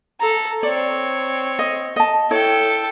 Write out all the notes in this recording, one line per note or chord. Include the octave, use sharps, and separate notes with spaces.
A4 A#5
C4 C#5 D5
D#5
D#5 A5
E4 A4 C#5 G5